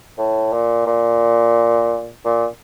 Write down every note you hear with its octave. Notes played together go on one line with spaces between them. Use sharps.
A2
A#2
A#2
A#2